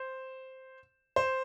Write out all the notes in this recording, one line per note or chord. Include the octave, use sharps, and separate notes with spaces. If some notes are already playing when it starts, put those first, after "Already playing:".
Already playing: C5
C5